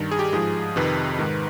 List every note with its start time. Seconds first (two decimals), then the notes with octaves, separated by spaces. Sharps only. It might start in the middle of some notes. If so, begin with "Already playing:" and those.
Already playing: G2 D#3
0.11 G#4
0.19 G4
0.33 G#2 F3 G#4
0.76 F2 C3 D#3 B4
1.19 G#2 D#3